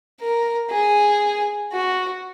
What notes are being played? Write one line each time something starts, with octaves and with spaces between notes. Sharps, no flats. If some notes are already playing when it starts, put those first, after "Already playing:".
A#4
G#4
F#4